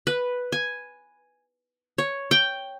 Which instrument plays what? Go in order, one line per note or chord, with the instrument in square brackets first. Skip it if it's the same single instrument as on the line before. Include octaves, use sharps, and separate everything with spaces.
[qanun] B4
G#5
C#5
G5